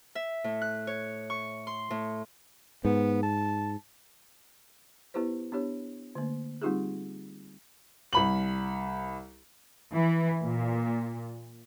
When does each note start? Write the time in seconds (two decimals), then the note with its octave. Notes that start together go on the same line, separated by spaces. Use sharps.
0.15 E5
0.44 A2
0.62 F#6
0.87 C#5
1.30 C#6
1.67 C6
1.90 A2
2.85 G#2 B3
3.23 A5
5.14 B3 E4 G4 B4 C5
5.52 B3 D4 G4 C#5
6.15 D3 A3 A#3
6.62 G3 C4 D#4 F4 G4 G#4
8.13 C2 B5 F#7
9.93 E3
10.42 A#2